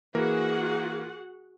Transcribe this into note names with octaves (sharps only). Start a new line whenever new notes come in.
E3 A#3 F#4 G#4 A#4 F#5